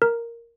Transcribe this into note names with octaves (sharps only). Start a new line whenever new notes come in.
A#4